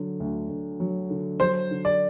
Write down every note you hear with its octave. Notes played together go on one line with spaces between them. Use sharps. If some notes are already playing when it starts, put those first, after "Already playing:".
Already playing: D3 F#3
D2
D2
F#3
D3
F#3 C5
D3
D5